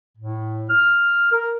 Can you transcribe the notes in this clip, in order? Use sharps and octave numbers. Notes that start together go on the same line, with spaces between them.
A2
F6
A#4